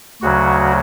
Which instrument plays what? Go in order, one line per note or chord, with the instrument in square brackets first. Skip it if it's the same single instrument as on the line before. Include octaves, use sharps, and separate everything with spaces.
[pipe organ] D2 C#3 F#3 F#4